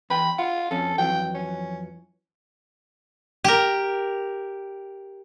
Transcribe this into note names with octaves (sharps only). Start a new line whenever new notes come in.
E2 G5 B5
F4 F#5
F2 C#4 A4
F2 E3 F#3 G5
C#4
G4 A#4